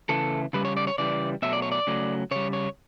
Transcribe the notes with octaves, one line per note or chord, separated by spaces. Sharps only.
C#3 E3 A3 A4
C#3 G3 B4
C#5
D5
C#5
C#3 E3 G3 D5
B2 F#3 A3 E5
D5
C#5
D5
C#3 F#3 A3
C#3 G3 C#5
C#5